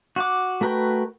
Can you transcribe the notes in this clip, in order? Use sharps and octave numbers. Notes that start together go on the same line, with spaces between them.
F#4 F#5 D6
A3 F#4 A#4 B4 G5